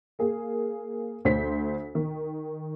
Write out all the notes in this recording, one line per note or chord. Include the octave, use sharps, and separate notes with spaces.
A#3 G#4
D2 C5 B6
D#3